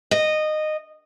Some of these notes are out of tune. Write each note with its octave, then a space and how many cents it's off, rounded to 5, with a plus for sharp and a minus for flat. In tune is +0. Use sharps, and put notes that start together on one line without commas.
D#5 -15